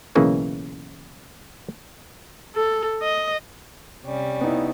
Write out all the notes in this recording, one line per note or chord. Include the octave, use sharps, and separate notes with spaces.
B1 C#3 E3 A#3 G#5
A4
D#5
C3 G3 C#4
B3 D#4 E4